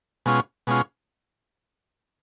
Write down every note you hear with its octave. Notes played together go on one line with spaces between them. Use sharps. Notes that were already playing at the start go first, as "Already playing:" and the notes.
B2 G#3 C#4 F4
B2 G#3 C#4 F4